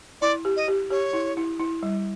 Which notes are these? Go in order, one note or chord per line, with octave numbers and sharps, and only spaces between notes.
E4 D5
G4
D#5
G4
G4 C#5
E4
E4
E4
G3